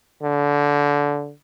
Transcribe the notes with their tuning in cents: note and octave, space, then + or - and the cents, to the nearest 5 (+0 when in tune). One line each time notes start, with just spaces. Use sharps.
D3 -20